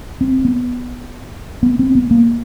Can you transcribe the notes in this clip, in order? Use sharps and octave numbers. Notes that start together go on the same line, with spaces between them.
C4
B3
B3
C4
B3
A#3